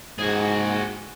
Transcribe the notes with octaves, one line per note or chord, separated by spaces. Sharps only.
G#2 F#4 G#4